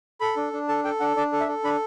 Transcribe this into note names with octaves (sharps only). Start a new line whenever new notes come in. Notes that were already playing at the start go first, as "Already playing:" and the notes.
A4 B5
D4
D4
A4 A5
A4 G5
D4 F#5
D4 D5
A4
E5
A4
D4 B5